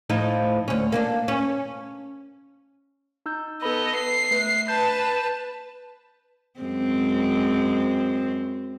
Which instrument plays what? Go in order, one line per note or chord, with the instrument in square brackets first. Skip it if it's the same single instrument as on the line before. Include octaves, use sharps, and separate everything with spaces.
[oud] A2 F3 D#4
D2 C#4
A#3 C#4 D4
C#4
[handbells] D#4 E6 G6
[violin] B3 D#5 [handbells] A4 B5
[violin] C7
[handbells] A3 B4
[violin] B4 A5 [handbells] G6
[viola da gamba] F#2 G#3 C4